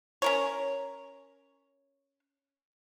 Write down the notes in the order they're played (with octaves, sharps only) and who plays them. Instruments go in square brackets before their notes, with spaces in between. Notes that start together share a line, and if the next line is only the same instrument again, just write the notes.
[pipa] C#4 A#4 C#5